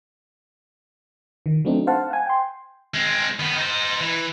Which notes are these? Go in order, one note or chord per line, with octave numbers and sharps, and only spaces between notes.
D#3
F#3 A3 C4 D4 D#4
C5 F5 F#5 A5
F#5 G#5
G5 C6
G#3 C4
D#3 B3
D#4 C5
E3